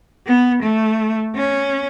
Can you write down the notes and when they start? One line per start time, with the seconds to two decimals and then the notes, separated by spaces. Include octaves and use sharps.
0.26 B3
0.63 A3
1.35 C#4